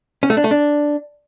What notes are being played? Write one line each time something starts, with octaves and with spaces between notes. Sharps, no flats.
C#4
A3
D4
A3
D4